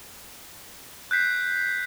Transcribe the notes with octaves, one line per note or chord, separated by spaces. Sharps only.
F#6 G6 B6 C7